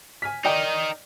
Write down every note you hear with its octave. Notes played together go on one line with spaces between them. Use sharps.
G#5 F6 B6
D#4 A#4 D5 D#5 G5